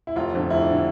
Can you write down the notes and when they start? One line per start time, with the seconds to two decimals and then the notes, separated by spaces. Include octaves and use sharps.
0.07 E4
0.16 F1 F4
0.34 F2 D3
0.50 F1 E4
0.61 D4
0.71 D3